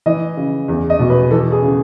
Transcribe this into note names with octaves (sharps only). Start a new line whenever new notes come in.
E3 D#5
C#3
E2
D#5
B2
B4
E3 A4
G#4
C#3